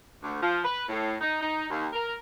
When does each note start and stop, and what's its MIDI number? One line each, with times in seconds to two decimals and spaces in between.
0.23 0.38 38
0.41 0.59 53
0.65 0.84 71
0.89 1.16 45
1.21 1.38 63
1.41 1.67 63
1.70 1.86 39
1.93 2.15 70